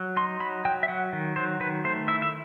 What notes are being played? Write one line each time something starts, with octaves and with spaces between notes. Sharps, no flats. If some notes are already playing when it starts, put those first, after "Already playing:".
Already playing: F#3
D#4 C6
F#3 B5
F#3 G5
E5
F#3 F#5
D#3
F#3 C5
D#3 B4
A3 C5
E4 E5
E5